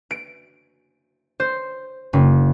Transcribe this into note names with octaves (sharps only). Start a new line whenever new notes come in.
D7
C5
F#1